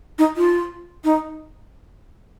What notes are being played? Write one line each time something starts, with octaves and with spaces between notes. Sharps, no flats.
D#4
F4
D#4